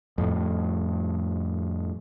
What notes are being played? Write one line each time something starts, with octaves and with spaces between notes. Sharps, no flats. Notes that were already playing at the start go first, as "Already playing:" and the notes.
F2 A2